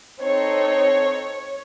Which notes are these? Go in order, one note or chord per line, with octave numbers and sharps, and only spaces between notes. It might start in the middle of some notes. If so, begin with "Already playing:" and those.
C4 D#4 A4 C#5